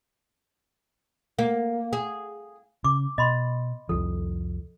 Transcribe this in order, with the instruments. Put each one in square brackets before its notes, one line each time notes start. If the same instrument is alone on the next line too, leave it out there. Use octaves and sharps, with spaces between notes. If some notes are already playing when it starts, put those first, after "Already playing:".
[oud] A#3
G#4
[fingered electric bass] C#3 [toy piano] D6
[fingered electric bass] B2 [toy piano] D#5 B5 C6
[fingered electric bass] C2 F2 F3 [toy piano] A4